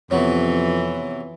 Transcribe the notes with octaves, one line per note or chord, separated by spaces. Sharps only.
F2 C3 E3 F#3 B3 C#5